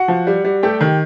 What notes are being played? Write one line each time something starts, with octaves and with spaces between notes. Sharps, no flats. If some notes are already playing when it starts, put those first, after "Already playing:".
Already playing: F#4 F#5
F3
G3
G3
A3 G4 G5
D#3